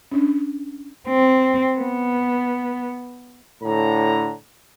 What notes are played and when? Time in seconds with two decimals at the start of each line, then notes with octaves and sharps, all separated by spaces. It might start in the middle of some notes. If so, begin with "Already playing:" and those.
0.12 C#4 D4
1.08 C4
1.78 B3
3.62 A2 D3 A#5